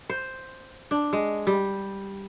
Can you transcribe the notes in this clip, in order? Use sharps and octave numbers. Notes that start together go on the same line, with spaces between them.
C5
D4
G#3
G3